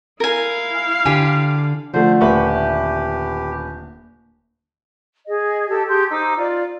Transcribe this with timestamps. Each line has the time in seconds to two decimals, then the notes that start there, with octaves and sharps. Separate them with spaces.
0.20 E4 A#4 F5 G#5
1.06 D3 G4 G#5
1.94 D3 F3 A3 C5
2.21 D#1 A3 G4 B4 B5 C#6
5.27 G#4 D#5
5.69 G4 A4 A5
5.89 G4 G#4 C6 G6
6.11 D#4 C5 D6 E6
6.37 F4 D5